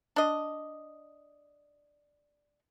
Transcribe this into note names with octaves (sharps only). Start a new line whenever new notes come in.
D4 D#5